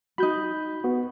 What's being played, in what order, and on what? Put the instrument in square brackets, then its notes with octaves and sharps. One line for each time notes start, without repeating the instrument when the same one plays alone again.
[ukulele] D#4 F#4 [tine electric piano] B5 G6
[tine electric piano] B3 F#4